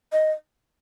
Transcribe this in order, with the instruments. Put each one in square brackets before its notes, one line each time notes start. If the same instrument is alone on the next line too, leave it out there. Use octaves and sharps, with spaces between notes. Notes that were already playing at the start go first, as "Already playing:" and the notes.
[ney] D#5